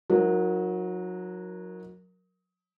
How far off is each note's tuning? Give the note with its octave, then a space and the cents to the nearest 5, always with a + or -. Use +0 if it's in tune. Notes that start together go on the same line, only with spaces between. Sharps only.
F#3 -25 D#4 +25 A#4 +0